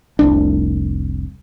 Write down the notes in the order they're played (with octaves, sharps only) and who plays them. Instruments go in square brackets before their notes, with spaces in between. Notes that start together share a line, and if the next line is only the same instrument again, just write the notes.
[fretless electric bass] F1 C2 D4